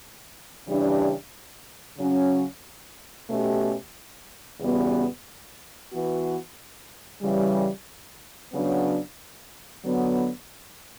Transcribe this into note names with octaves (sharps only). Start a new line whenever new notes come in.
C#3 E3 G3 D4 G4
C#3 F#3 C#4
B2 A3 C#4 G4
E2 C#3 G3 B3 F#4
E3 B3 F#4
C#3 E3 G3
C#3 F#3 B3 D4
D3 F#3 B3